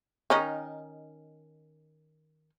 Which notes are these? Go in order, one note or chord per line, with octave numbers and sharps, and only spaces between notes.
D#3 C#4 D#4